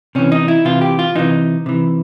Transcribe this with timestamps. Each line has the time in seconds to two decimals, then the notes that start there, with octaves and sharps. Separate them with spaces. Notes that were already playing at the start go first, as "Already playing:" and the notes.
0.15 C3 E3 C#4
0.32 D#4
0.48 E4
0.65 C3 E3 F4
0.81 G4
0.99 F4
1.15 C3 E3 D#4
1.66 C3 E3